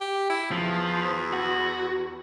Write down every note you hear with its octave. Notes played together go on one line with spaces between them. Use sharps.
G4
E4
E2 F3
F#4